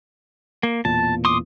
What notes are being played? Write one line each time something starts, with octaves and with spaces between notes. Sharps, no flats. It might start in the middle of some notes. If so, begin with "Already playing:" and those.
A#3
E1 E2 A#2 A5
C6 D6 D#6